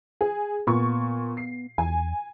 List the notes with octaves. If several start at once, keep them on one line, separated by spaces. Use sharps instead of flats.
G#4
A#2 B3 C#6
C7
E2 G#5